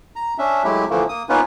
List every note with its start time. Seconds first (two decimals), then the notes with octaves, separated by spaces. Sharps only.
0.16 A#5
0.38 C#4 D4 E5
0.64 F#3 G#3 A3 E4 G4
0.90 D3 E3 F3 A3 A#3
1.09 A#3 D#6
1.29 A#3 B3 C#4 D#4 F4 B4